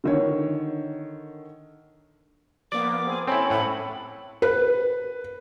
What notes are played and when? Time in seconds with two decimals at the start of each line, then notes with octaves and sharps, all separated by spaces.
0.04 D3 D#3 C#5
2.72 F3 A#3 B3 D5 D6
3.07 C4 G#4
3.27 C4 C#4 E4 A4 C#5 B5
3.50 A2 F#5 B5
4.42 B4